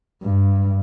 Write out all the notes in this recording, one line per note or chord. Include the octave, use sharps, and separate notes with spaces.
G2